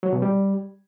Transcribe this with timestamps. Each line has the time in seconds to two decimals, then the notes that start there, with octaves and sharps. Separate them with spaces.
0.03 F#3
0.13 B2
0.22 G3